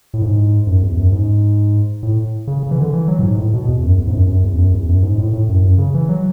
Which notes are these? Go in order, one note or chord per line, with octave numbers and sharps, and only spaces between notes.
A2
G#2
F#2
E2
F#2
G#2
A2
C#3
C#3
E3
D3
E3
F#3
A2
G#2
A2
B2
E2
F#2
E2
G#2
F#2
F#2
E2
F#2
E2
F#2
G#2
A2
A2
F#2
F#2
C#3
E3
F#3